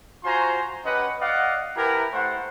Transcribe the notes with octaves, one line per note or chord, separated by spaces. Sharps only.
F4 F#4 C5 G#5 A#5 C6
C#4 G4 B4 D#5 F#5
D5 D#5 F5 F#5
E4 G4 A#4 B4 A5 A#5
A3 E4 C5 F#5